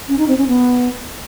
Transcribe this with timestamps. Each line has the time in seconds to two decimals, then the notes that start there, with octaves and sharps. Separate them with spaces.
0.08 C#4
0.18 D#4
0.28 C4
0.38 C#4
0.48 B3